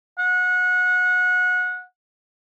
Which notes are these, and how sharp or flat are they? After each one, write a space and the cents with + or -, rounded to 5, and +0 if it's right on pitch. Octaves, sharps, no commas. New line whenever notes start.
F#5 -25